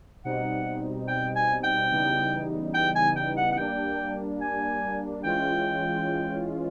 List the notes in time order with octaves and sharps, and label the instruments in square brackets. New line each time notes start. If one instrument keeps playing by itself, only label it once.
[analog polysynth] B2 G3 C4 D#4 [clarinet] F#5
[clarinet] G5
G#5
G5
[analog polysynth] C#3 E3 G3 B3 D#4
[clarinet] G5
G#5
G5
F#5
F#5
[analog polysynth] G3 A#3 D4 [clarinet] G5
[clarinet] G#5
[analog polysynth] E3 G#3 C#4 F4 [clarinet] G5